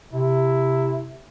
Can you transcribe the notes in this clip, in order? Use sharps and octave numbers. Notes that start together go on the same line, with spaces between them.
C3 E4